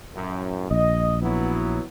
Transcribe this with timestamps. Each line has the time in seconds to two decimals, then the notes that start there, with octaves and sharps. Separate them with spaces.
0.15 F#2 A2
0.71 A#1 D#5
1.23 F#3 B3 E4